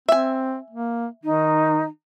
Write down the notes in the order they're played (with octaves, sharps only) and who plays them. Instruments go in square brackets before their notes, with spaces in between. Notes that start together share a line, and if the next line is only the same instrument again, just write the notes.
[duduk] C4 [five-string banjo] E5 G#5
[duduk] A#3
[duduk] D#3 [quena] D#4